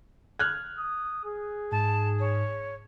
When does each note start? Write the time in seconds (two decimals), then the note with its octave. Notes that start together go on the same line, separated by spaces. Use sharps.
0.39 F6 F#6 G#6
0.78 D#6
1.25 G#4
1.72 G#2 A5
2.20 C#5